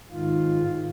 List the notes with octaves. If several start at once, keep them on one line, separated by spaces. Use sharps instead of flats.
G#2 D#3 F4